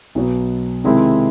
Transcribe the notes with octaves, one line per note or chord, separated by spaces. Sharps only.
B1 B2 F#3 B3
C3 D#3 G#3 C4 E4